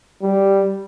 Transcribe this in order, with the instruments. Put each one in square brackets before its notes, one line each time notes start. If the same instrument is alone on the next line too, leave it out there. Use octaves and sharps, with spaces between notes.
[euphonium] G3